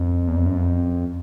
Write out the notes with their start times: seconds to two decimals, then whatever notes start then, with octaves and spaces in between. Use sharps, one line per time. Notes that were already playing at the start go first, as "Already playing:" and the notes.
Already playing: F2
0.28 E2
0.37 F2
0.46 F#2
0.55 F2